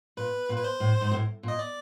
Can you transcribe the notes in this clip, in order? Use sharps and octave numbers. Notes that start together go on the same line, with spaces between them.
A#2 B4
A#2
B4
C5
A2
G#2
A2
A#2
D#5
D5